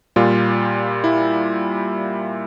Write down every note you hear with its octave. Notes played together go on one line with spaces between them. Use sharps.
A#2 G3 F4
E4